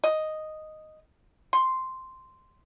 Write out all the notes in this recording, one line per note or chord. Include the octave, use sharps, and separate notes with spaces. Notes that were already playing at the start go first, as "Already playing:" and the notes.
D#5
C6